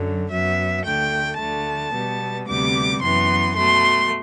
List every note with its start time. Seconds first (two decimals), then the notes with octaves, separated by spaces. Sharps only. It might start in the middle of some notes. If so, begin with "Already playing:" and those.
Already playing: F#2 D3 F#3
0.30 F#2 F#3 B3 E5
0.85 D2 D3 A3 G5
1.39 D2 D3 A3 A5
1.93 B2 G3 B3
2.47 D2 C3 G3 B3 D6
3.02 F#2 E3 B3 C6
3.56 B2 A3 C6